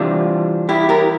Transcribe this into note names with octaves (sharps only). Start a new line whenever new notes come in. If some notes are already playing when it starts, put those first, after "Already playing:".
Already playing: C3 E3 G3 D4 F4
E4 G4
G4 A#4